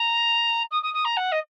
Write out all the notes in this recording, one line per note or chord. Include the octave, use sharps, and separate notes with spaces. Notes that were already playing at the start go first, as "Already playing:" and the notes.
Already playing: A#5
D#6
D#6
D#6
A#5
F#5
D#5